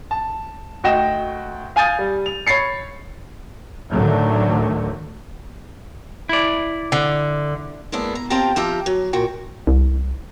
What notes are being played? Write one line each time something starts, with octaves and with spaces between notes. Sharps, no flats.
A5
D2 F#4 D#5 G5 A#6 E7
F5 G#5 D#6 G6 A6 D#7
G3
F7
C#5 B5 A6 C7 C#7
D2 A2 D3 D#3 F#3 A3
E4 D5
D3
G#3 A#3 B3 D4 E4
A#5
C4 F4 G4 G5 A5 A#5
F3 F4 G4 E5 A#5
F#3
A#2 F#3 F#4 G5
C2